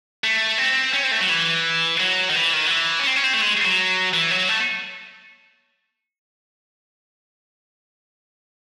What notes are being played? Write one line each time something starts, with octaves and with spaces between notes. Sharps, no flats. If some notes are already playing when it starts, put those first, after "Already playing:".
A3
C4
C#4
C4
A3
F#3
E3
F#3
D#3
E3
D#3
F#3
E3
C#4
C4
C#4
C4
A3
G#3
F#3
E3
F#3
A3